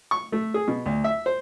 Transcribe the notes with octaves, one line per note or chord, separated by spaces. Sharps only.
C#6
A3
G#4
B2
D2
E5
C5